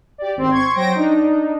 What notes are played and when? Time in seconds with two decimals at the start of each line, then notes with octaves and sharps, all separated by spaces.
0.18 G4 D5
0.36 G#1 C4 C6
0.51 C6 C#6 G#6
0.75 F#3 C5 G5 A#6 D7
0.95 D4 D#4